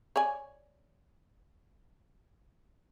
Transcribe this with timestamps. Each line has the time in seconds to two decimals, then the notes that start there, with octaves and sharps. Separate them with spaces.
0.16 C#5 D5 G#5